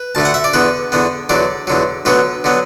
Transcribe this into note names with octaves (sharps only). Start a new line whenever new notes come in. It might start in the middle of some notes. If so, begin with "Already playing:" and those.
Already playing: B4
D2 D3 A3 A5
F#5
E5
D5
E2 D3 B3 B4
E2 D3 B3
E2 D3 F#3 D5
E2 D3 F#3
D2 D3 F#3 B3 B4
D3 F#3 B3